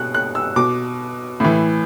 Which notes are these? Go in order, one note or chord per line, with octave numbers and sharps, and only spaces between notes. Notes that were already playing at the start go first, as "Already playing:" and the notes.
Already playing: B2 F#6
F#6
E6
B2 D6
A2 E3